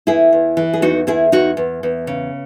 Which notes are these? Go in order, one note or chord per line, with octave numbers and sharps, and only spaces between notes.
E2 E4 G#4
E2
E3
G#4
E2 D#4 F#4
E2 E4 G#4
E2 D#4 F#4
E2
E2
C#3